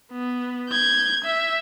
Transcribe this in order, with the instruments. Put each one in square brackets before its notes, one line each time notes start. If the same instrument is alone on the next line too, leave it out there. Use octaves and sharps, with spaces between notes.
[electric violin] B3
G6 G#6
E5